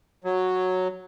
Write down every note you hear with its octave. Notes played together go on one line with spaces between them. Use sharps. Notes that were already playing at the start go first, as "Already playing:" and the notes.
F#3